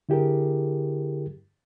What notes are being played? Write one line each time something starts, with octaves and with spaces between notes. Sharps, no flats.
D3 E4 G4 G#4 A#4